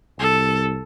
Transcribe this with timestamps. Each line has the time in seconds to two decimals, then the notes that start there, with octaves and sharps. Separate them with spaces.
0.19 C2 A4